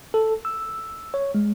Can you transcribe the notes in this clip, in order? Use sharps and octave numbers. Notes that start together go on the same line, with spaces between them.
A4
E6
C#5
G#3